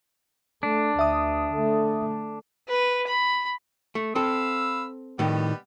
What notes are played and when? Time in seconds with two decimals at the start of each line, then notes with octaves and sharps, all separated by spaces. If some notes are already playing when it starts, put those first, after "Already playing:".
0.63 A3 D4
0.99 D2 E5 D#6
1.54 D3 A3
2.68 B4
3.07 B5
3.95 A3
4.15 C4 A4 F5 B5 E6
5.19 A2 D#3 G3 B3 G4